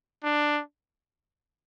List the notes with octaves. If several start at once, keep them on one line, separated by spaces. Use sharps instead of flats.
D4